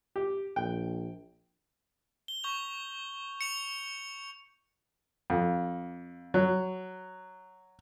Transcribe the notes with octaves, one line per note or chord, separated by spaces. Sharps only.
G4
A#1 G5
G7
C#6 G6 F7
C#7 F7
F2
F#3